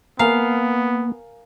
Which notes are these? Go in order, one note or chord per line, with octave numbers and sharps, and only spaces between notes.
A#3 B3 A#4 F5 G#5 A#5